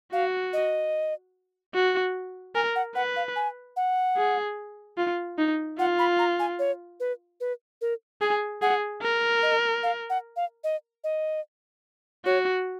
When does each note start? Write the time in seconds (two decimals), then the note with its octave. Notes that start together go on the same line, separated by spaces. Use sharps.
0.12 F#4 F5
0.53 D#5
1.74 F#4
2.55 A#4 G#5
2.75 F#5
2.95 B4 F#5
3.16 F5
3.36 G#5
3.76 F#5
4.17 G#4
4.98 F4
5.38 D#4
5.79 F4 F#5
5.99 B5
6.19 A#5
6.39 G#5
6.59 C#5
7.00 B4
7.41 B4
7.81 A#4
8.21 G#4 G#5
8.62 G#4 F#5
9.02 A#4
9.43 D#5
9.83 F5
10.10 F#5
10.36 F5
10.64 D#5
11.04 D#5
12.25 F#4 C#5